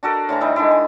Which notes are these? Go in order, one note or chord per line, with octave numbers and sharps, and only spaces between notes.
D4 F#4 A4 A#4
A2 D3 E3 A#5
G3 D#4 E4
D3 D#3 G#3 E4
G#5